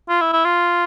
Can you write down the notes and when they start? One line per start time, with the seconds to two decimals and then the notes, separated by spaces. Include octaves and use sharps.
0.09 F4
0.21 E4
0.33 E4
0.45 F4